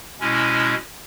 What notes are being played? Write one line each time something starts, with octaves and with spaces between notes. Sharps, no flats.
B2 G#3 C#4 E4